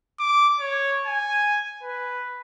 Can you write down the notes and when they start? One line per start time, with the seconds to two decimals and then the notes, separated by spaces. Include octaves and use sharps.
0.19 D6
0.60 C#5
1.06 G#5
1.83 B4